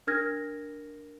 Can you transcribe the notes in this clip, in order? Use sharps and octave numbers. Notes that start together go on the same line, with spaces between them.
D4 A#4 F6 G#6 A#6